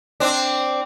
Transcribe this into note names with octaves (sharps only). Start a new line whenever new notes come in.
C4 D4